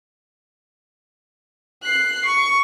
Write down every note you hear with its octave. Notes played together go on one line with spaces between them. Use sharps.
F#6 C7
C#6